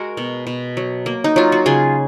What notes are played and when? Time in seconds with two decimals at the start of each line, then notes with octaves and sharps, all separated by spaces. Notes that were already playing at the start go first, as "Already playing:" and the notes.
Already playing: G#3 F#4 A#4
0.17 B2
0.47 B2
0.77 F#3
1.06 A#3
1.24 D#4
1.36 F#3 F4
1.52 F#4
1.66 C#3 F4 G#4